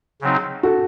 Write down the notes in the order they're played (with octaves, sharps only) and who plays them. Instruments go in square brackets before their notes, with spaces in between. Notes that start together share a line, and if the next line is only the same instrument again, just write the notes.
[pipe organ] C#3 F#3 C4 D#4
[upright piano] F#4 A4